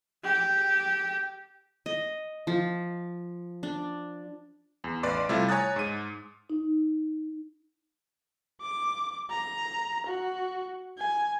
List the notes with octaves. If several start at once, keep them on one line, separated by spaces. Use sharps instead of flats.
G4
D#5
F3
D4
E2
A1 B4 D5 C6 D6
C3 G3 A3 E4 F4 A6
C#5 G#5 A#5 D#6 F#6 A6
G#2 D#7
D#4
D6
A#5
F#4
G#5